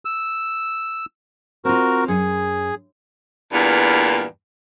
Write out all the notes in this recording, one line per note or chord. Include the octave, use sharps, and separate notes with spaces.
E6
C4 F4 F#4 A#4
F#2 G#4
E2 G2 A#2